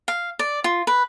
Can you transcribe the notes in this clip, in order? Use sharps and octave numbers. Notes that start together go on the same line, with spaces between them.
F5
D5
F4
B4